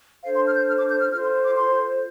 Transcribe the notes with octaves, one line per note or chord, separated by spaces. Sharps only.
D4 A4 C5 F5
C6
F6
G6
F6
D6
G6
F6
F4 A4 C5 F6
C6
C6
D6
C6